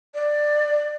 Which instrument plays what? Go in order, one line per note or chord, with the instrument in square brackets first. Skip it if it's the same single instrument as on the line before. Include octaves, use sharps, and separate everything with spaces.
[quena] D5